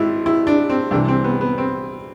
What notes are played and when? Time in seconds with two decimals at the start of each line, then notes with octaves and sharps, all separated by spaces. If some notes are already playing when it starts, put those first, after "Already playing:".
Already playing: G#1 G#2 E4
0.26 E4
0.47 D4
0.70 C4
0.91 C2 C3 E3 D4
1.08 C4
1.24 B3
1.41 B3
1.58 C4